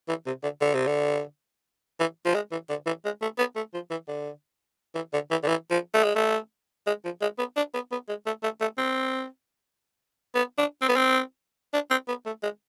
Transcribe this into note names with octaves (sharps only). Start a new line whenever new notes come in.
E3
C3
D3
D3
C3
D3
E3
F3
G#3
E3
D3
E3
G#3
A3
B3
A3
F3
E3
D3
E3
D3
E3
D3
E3
F3
A3
G#3
A3
G#3
F3
G#3
B3
D4
B3
B3
G#3
A3
A3
A3
C4
B3
D4
C4
B3
C4
D4
C4
B3
A3
G#3